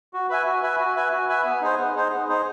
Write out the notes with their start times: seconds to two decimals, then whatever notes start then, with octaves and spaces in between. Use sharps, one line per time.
0.13 F#4
0.29 B4 E5 G#5
0.46 F#4
0.62 B4 E5 G#5
0.79 F#4
0.96 B4 E5 G#5
1.12 F#4
1.28 B4 E5 G#5
1.45 B3
1.61 D#4 G#4 C5
1.78 B3
1.95 D#4 G#4 C5
2.12 B3
2.28 D#4 G#4 C5